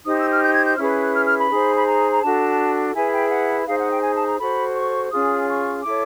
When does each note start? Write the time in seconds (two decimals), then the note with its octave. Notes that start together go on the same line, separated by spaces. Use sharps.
0.05 D#4 G4 C5 D#6
0.17 E6
0.30 F6
0.41 G6
0.54 G#6
0.65 G6
0.78 C#4 E4 G#4 B4 F6
0.90 F#6
1.02 F#6
1.15 F6
1.27 F6
1.38 B5
1.50 D#4 G#4 C5
1.76 B5
1.87 A#5
2.12 A#5
2.22 D4 F#4 A4 A5
2.95 E4 G#4 B4 G#5
3.12 G5
3.30 F#5
3.67 D#4 G#4 C5 F5
3.80 F#5
3.91 G5
4.03 G#5
4.16 A5
4.28 A#5
4.39 F#4 A4 C5 B5
4.76 C#6
5.12 C#4 F4 G#4 D#6
5.47 C#6
5.84 E4 A4 C#5 D6